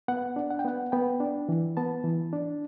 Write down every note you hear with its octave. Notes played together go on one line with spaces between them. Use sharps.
B3 F#5
D4
F#5
G5
B3 F#5
B3 G5
D4
E3
B3 A5
E3
D4